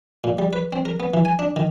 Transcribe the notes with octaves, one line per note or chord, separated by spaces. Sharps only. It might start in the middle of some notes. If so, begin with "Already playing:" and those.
A#2
G3
B4
C4
A#4
B3
E3
G#5
D4
D#3